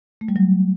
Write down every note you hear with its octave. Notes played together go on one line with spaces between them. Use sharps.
A3
G3
F#3